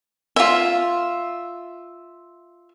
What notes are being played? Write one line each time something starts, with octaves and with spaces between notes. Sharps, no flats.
F4 E5